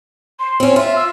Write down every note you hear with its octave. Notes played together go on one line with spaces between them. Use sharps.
C6
C4 C#4
F4 E5
E6